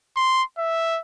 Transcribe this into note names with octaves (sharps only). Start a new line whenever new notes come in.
C6
E5